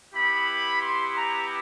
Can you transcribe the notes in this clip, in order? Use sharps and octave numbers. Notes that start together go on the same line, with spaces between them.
B3 E4 G4 B5
C6
A#5